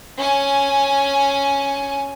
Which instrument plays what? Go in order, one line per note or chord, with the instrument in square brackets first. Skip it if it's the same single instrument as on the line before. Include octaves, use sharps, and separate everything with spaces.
[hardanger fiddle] C#4 G#5